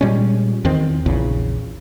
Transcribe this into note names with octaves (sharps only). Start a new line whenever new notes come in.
A#2 G3 G#3 C#4
E2 D#3 C4
A#1 E2 C#3